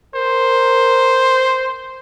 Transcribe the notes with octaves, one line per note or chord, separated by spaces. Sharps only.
A#4 C5